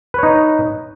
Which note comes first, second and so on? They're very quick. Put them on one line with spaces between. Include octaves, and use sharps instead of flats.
B4 C#5 D#4